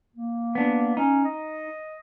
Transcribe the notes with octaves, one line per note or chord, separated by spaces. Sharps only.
A#3
B3 D4
C#4 D#4
D#5